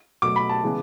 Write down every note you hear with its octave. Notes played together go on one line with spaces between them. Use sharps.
B2 F#3 A3 D6
B5
A5
C#3 E3 G#3 B3